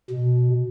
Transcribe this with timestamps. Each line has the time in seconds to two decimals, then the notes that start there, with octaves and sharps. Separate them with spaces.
0.10 B2